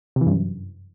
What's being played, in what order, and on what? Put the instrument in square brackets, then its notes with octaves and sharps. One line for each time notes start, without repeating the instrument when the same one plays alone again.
[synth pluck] C3
E3
G2
F#2